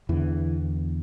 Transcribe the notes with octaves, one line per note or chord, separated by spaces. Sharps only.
E2 D3 E3